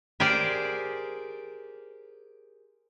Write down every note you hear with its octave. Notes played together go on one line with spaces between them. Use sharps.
G4 G#4 A#4 C5 D5